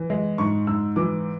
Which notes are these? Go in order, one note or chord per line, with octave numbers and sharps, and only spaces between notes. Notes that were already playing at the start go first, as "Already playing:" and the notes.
Already playing: E3
G#3
G#2 C#6
G#2 E6
E3 D6